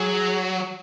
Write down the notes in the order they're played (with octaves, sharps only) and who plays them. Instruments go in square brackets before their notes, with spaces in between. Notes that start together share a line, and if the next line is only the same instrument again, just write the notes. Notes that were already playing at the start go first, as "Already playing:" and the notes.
Already playing: [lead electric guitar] F#3 [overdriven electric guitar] G#4